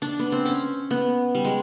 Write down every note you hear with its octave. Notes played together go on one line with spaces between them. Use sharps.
D4
B3
C4
C#4
B3
G3
G#3